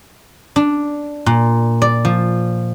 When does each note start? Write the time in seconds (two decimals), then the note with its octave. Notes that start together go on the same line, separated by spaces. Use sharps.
0.56 D4
1.26 A#2
1.82 D5
2.05 F3